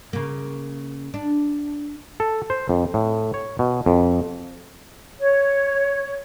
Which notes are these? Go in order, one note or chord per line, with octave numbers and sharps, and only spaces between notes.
C#3 A#3
D4
A4
C5
F2
A2
C#5
B2
F2
C#5